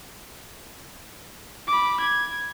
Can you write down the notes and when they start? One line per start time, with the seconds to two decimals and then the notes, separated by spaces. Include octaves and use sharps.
1.67 B5 D6
2.01 G#6